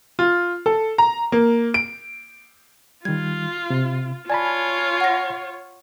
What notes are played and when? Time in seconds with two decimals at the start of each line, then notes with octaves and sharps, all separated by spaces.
0.19 F4
0.66 A4
0.98 A#5
1.32 A#3
1.74 D7
3.05 D#3 G3 F4 G#6
3.70 C3
4.30 F4 C#5 D5 G#5 A5 B5
5.01 F#5 A#6